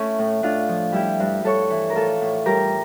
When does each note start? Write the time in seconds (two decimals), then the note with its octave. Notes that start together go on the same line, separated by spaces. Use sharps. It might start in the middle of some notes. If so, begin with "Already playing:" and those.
Already playing: A3 C#4 E4
0.19 A2
0.43 A2 D4 F4
0.68 F3
0.92 G3 E4 G4
1.20 G2
1.44 G2 A4 C#5
1.70 E3
1.90 A#4
1.95 A2 F4 A4
2.21 A2
2.46 G3 G4 A#4